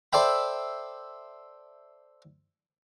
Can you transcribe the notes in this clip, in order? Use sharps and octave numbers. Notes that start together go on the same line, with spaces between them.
A4 C5 D5 E5 G5 B5